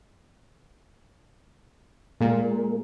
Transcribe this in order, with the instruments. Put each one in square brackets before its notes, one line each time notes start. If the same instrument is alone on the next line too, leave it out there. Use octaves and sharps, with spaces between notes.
[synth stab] A#2 [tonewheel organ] G#3 A#3